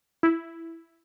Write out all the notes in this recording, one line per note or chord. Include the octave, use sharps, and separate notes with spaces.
E4